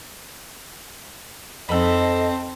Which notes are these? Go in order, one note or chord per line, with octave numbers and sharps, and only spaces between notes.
F2 C4 D#4 A4 D#5 B5